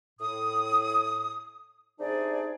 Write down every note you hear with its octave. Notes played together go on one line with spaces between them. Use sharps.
A2 D#6
C3 D4 D#4 G#4 C5 D5